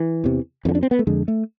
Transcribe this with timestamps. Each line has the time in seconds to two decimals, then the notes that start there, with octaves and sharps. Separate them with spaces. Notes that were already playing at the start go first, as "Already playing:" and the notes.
Already playing: E3
0.24 E2 C3
0.65 F2 E3
0.69 D3
0.75 D4
0.83 C4
0.91 B3
0.99 A3
1.07 F2 D3 G#3
1.28 A3